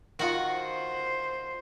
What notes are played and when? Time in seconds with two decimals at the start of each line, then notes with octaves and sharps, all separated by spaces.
0.19 D#3 D#4 F4 F#4 F#5
0.55 C5